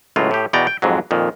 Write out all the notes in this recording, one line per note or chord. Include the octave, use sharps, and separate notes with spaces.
C#2 A2 F#3 F4
A2 G4
E2 B2 B3 D5 G5 A#5
G5
F2 G#2 F#3
F2 A#2 D#3